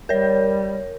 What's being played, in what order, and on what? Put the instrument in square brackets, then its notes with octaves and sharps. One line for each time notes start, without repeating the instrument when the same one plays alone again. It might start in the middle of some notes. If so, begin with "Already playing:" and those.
[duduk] G3 [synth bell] A#4 C#5